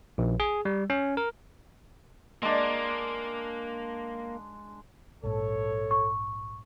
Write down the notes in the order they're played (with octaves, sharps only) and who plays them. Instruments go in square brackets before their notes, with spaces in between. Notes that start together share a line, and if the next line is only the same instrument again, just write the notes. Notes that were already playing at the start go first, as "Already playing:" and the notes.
[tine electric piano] A#1
G#4
G3
C#4
A#4
[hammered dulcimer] G#3 D4 [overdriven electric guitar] A#3
[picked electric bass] A#1 G#2 [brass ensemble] A4 C#5
[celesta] C#6